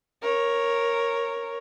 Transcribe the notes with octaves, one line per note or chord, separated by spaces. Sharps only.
A#4 C#5